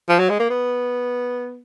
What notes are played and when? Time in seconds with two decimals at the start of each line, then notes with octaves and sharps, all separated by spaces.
0.09 F3
0.19 F#3
0.30 G#3
0.39 A#3
0.50 B3